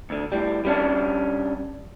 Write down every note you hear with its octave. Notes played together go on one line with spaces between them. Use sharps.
D2 D3
A2 G3
G3 C#4 D4